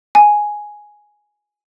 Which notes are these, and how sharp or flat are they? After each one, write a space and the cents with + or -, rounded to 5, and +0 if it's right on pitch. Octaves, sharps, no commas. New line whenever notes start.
G#5 +5